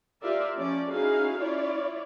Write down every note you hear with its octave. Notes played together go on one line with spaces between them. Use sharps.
F4 G4 A#4 D5 E5
F3 C#4 D5
C#4 D#4 E4 F#4 G#4 F5
E4 F4 C#5 D5